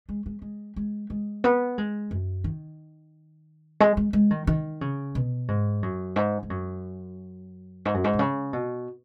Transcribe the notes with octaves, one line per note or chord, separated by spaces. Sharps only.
G#3
G#3
G#3
G#3
G#3
B3
G#3
F#2
D#3
G#3
G#3
G#3
D#3
D#3
C#3
B2
G#2
F#2
G#2
G#2
F#2
G#2
F#2
G#2
B2
C#3
B2